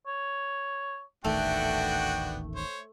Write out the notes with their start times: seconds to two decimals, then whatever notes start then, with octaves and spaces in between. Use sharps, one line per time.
0.07 C#5
1.24 D#1 A1 D#3 A3 B3 D4 F#4 G5
2.55 C5 C#5